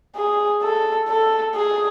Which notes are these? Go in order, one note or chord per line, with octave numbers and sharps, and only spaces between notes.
G#4
A4
A4
G#4